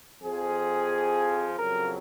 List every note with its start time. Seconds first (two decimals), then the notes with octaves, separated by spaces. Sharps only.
0.22 F2 F3 G#4
1.56 F2 C#3 F#3 A#4